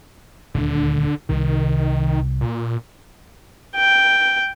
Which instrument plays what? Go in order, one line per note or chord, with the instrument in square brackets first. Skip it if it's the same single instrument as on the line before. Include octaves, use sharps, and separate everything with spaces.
[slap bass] D#1 D2 D4 [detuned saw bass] D3
[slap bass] C2 C3 [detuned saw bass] D#3
[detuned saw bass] A#2
[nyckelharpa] G5